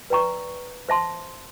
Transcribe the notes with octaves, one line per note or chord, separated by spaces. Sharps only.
B4 D5 G5 A#5 C#6
C5 E5 A5 C6